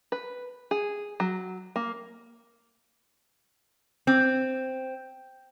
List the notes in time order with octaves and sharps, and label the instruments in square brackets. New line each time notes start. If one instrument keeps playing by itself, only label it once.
[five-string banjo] B4
G#4
F#3
A#3
[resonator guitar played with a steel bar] C4